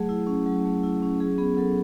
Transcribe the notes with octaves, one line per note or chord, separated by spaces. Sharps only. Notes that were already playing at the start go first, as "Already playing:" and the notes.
Already playing: F#3 A3 G#4
E4
C#4
F#3
A3
E4
C#4
F#3 G#4
B3 G#4
F#3 A4